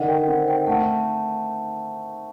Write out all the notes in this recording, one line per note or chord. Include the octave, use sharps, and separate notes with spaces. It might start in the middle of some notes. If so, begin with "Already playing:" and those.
Already playing: D3 D#3 A4 A#4 D5 D#5 F#5
G5
C4 F#5
G5
A3 F#5